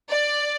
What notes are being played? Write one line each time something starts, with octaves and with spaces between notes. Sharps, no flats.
D5